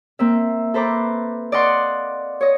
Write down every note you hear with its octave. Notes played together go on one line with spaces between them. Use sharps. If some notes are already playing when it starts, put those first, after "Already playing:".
A#3 C4 E5
A4 B4 C5 A#5 D6
D5 D#5 F5 F#5 C6 C#6
C#5 D#5